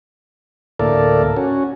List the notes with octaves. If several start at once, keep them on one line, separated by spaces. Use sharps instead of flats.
D2 A2 A#3 A4 A#4 D5
C#4 F#4